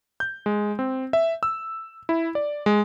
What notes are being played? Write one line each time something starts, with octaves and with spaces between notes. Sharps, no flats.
G6
G#3
C4
E5
E6
E4
D5
G#3